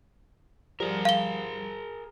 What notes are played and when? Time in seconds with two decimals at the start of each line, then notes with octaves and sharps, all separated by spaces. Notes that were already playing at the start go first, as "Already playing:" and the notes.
0.80 F3 G3 G#4 A#4
1.05 F5 G7